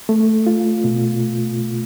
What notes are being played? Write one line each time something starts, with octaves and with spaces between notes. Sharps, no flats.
A3
F4
B2